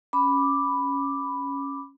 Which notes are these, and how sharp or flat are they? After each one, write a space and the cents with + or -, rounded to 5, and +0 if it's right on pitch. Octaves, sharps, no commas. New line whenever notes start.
C#4 +0 B5 +0 D6 +0